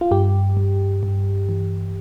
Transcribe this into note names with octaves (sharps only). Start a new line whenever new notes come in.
F4
G2 G4
G2
G2
E3